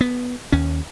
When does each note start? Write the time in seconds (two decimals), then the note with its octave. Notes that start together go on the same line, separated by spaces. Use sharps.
0.01 B3
0.52 D#2 C#4